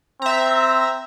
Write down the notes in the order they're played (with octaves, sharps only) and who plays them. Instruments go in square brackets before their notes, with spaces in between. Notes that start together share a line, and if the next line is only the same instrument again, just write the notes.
[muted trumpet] C4 [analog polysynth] E5 A#5